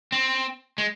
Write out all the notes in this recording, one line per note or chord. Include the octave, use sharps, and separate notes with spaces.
C4
G#3